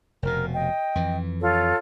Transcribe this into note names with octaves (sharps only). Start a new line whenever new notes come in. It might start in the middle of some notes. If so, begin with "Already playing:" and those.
F1 B2 A#4
D#5 G5
F2 E3
F4 A4 C#5